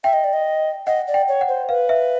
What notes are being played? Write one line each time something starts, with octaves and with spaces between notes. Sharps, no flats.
E5 G5
D#5
D5
D#5
D#5 F#5
D5
G5
C#5
F#5
C5
B4 F5
E5